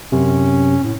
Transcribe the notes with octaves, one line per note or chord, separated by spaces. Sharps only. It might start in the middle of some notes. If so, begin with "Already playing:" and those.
F#2 C3 C#4
A2